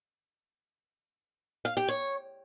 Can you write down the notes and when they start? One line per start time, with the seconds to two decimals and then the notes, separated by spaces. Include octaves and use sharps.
1.65 F5
1.77 G4
1.88 C#5